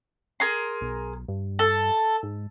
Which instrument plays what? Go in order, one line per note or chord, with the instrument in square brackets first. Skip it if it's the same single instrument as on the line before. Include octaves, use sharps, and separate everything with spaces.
[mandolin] G#4 A#4 C6
[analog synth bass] B1
G2
[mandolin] A4
[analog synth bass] G#2